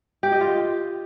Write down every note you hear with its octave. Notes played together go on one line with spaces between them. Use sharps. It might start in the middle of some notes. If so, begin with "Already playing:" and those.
G4
D#5
F4